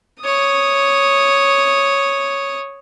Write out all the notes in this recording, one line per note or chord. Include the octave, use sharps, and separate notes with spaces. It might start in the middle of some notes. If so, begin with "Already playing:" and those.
C#5 D#6